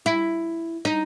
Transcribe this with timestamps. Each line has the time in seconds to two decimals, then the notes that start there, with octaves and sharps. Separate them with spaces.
0.06 E4
0.85 D#4